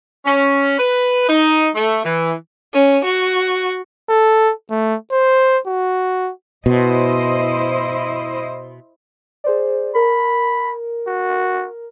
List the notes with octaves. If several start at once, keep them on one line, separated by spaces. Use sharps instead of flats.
C#4
B4
D#4
A3
E3
C#4
F#4
A4
A3
C5
F#4
B2 E4 C5 D#5
G#4 C5 D5
A#4 B5
F#4